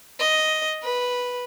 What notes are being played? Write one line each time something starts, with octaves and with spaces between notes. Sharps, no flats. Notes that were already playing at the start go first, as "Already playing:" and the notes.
D#5
B4